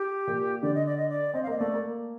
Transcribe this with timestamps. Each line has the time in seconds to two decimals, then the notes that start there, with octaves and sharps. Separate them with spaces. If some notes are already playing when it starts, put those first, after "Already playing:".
Already playing: G4
0.27 A#2
0.63 D3 D5
0.74 D#5
0.86 D5
0.97 D#5
1.09 D5
1.34 C4 D#5
1.43 F5
1.47 A#3 D#5
1.58 A3 D5
1.74 A#3